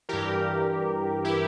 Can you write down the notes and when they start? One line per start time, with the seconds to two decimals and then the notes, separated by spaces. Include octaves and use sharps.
0.09 G2 E3 G4 A#4
1.25 E4 G4